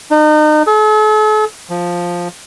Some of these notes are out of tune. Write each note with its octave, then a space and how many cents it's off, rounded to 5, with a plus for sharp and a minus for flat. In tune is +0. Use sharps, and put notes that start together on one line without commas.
D#4 -35
A4 -45
F3 +5